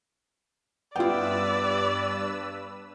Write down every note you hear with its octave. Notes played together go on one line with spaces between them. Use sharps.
G2 B3 E4 F4 B4 D5 G5 E6